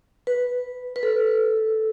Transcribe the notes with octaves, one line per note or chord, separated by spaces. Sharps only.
B4
B4
A4